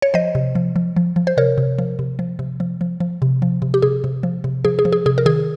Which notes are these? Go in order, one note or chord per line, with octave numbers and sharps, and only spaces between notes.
C#5
F3 C5 D#5
C3
F3
F3
F3
F3
C5
C3 A#4 C#5
C3
F3
C3
F3
C3
F3
F3
F3
C3
F3
C3
G4
C3 G#4
C3
F3
C3
F3 G#4
G#4
F3
G#4
C3 G#4
A#4
D#3 G#4